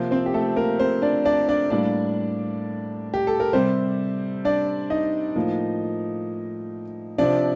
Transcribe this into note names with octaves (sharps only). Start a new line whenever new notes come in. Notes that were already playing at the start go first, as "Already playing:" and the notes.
Already playing: C3 F3 A#3 C4 C5
C4 C5
G4
A3 A4
A#3 A#4
C4 C5
D4 D5
D4 D5
D4 D5
A2 G3 A#3 D4 D5
G4
A4
A#4
C3 G3 C4 C5
D4 D5
D#4 D#5
A2 F3 A#3
C3 F3 C4 D4 D5